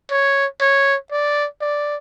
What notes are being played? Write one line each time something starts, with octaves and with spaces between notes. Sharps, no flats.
C#5
C#5
D5
D5